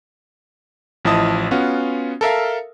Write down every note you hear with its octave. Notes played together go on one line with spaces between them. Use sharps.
A1 F3 E4 D#5 A5 D#6
B3 C#4 F4 F#4
A4 A#4 E5 F5